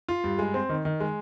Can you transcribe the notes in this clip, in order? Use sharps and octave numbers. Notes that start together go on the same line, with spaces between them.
F4
G2
G#3
C4
D#3
D#3
G#3